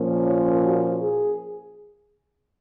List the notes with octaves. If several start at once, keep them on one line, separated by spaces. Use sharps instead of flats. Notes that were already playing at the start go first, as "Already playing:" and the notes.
Already playing: A#2 F3 A#3 C#4
C#5
F#4
G#4